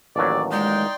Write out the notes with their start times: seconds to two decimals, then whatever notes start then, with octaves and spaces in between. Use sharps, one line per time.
0.16 A1 D#2 F#3 D5
0.52 G#3 D#4 D5 G5 C6